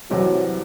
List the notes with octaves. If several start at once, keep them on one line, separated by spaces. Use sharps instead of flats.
C2 C3 E3 F#3 G3 C4